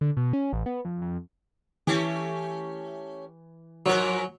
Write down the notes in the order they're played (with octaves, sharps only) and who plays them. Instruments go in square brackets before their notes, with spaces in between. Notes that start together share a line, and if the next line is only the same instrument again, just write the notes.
[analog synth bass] D3
B2
C#4
A1
B3
F2
F2
[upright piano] E3 [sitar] A3 C#4 G4
[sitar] G#2 F3 A#4 [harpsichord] F#3